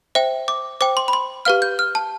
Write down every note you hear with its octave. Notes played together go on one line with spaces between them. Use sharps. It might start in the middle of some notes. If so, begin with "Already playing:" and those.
C5 E5 G5
D6
C5 G5 D6
C6
B5
C6
G4 B4 F5 F6
G6
F6
A5